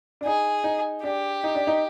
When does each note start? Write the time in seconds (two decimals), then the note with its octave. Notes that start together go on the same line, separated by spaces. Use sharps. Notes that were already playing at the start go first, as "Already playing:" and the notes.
0.21 D4
0.25 D#4 G#4
0.64 D#4
1.03 D4 G4
1.44 D#4
1.55 D4
1.67 D#4